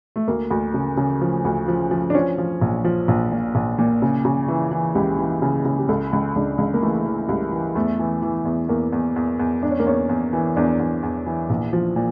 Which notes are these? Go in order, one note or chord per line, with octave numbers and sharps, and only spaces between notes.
A3
D2 A#3
D2
C#3
C#3
F3
D2
F3
F3
D4
F3 C#4
F3
A#1
F3
A#1
A#2
A#1
A#2
C#3
C#3
E3
E3
C#2 G4
E3
C#3
C#3
G4
C#2 A4
C#2
C#2 D4
C#2
A#3
E3 A3
E3
C#2 G3
E3
E2 A3
E3
E3
E2
E2 A#3
E2
E2
E2
E2 D4
C#4
A#3
E2 C#4
E2
E3
E2 D4
E2
E2
E3
A#1
F3
A#2